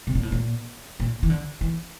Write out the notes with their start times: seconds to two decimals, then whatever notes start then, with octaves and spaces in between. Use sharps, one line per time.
0.07 C3
0.15 A#2
0.23 A2
0.32 A#2
1.00 A#2
1.23 E3
1.30 D3
1.61 E3